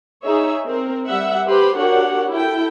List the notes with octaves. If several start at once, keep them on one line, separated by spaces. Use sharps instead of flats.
D#4 G#4 C#5 E5
C4 A#4
G3 E5 F#5
G4 B4 C5 B5 C6
D4 F#4 G4 A#4 C#5 F#5
E4 A4 G5